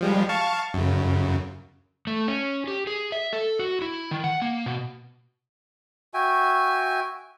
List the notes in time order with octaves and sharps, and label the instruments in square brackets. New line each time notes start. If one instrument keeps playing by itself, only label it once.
[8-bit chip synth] F3 G3 G#3
F5 A5 C#6
F#2 C#3
[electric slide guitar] A3
C#4
G4
G#4
E5
A4
F#4
E4
D#3
F#5
A#3
B2
[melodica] F#4 E5 G5 G#5